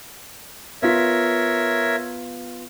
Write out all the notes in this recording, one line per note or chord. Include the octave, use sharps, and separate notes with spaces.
B3 F4 A#4 C#5 E5 B6